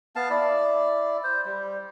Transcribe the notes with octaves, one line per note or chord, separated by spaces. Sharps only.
B3 F5 A5
E4 D5
C5
G3